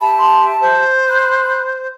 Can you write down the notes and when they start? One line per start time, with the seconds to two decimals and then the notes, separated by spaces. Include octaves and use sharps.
0.01 G4 E5 A5 B5
0.18 C6
0.61 C5
1.09 B5 F#6